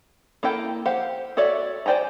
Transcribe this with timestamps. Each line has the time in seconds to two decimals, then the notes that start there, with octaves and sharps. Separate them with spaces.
0.43 A#3 E4 A4 G5
0.85 G4 C5 F5 F#5
1.37 F#4 A4 C#5 D5 E5
1.86 C5 D5 G5 G#5 A#5